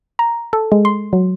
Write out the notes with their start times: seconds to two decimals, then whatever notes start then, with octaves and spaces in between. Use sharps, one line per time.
0.19 A#5
0.53 A4
0.72 G#3
0.85 C6
1.13 F#3